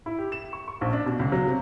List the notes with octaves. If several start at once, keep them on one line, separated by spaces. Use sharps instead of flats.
E4
G4
E7
C#6
C#6
A#1
D4
B2
C#2
F#3
C3